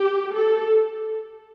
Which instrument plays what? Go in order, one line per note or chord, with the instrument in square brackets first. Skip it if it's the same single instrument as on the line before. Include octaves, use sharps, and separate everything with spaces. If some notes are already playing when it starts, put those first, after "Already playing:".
Already playing: [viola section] G4
A4